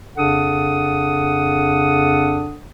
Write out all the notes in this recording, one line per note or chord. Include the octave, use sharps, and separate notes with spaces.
F2 C#3 D4 A4 F#5 D#6